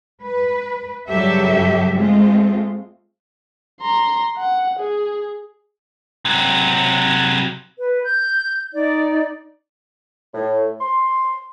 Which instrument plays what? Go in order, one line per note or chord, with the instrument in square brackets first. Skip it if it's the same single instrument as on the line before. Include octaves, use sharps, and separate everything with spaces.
[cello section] B4
G2 C#3 F#3 G4 A4 E5
G#3 A3 C4 F4
[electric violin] A#5 C6
F#5
G#4
[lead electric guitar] C3 F#3
[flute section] B4
G6
D#4 D5
[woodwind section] A2
C6